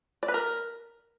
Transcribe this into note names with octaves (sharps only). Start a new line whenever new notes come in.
D5
B4
A#4